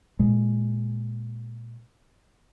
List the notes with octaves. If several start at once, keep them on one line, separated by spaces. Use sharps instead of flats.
A#2 G#3